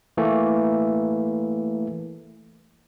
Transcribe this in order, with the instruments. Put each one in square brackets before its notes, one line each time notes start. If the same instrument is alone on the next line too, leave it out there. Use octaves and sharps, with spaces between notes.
[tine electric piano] E3 A3 A#3